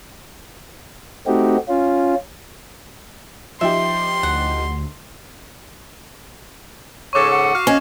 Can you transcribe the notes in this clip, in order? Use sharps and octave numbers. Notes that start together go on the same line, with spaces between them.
A3 C4 D#4 F#4 G4
C#4 F4
F3 D#4 G4 E5 C6
D2 F#5
G#2 C#3 A4 C#5 C#6 D6
F#5
F#4 F5
C#4 D#5